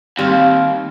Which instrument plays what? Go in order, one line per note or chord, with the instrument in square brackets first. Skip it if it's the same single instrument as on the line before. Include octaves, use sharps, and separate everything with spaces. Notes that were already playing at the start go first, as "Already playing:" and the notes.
[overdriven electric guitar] D#2 [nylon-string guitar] G3 [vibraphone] C4 [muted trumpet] F5